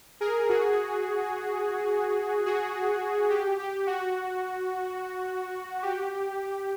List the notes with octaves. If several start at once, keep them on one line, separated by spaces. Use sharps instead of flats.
G#4 A#4
F#4 G#4
F#4 G#4
G4
G4
F#4
G4